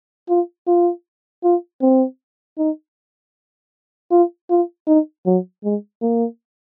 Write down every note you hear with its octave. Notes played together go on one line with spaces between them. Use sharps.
F4
F4
F4
C4
D#4
F4
F4
D#4
F#3
G#3
A#3